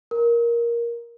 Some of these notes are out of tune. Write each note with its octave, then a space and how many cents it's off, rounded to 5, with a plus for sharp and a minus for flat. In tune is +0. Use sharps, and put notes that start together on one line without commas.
A#4 +10